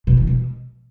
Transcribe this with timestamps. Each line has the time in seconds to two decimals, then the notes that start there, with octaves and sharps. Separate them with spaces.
0.07 B2
0.17 E3
0.27 B2